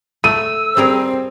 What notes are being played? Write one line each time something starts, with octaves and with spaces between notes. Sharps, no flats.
A3 E6 D#7
G3 C4 G#4 A#4